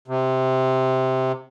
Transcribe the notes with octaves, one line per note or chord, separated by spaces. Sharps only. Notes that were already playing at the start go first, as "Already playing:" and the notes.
C3